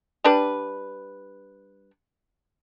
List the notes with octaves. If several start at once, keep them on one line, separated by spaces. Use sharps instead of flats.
G3 D4 B4